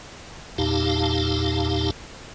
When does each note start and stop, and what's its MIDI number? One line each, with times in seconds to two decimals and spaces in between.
0.58 1.91 40
0.58 1.91 46
0.58 1.91 63
0.58 1.91 67
0.58 1.91 77
0.58 1.91 81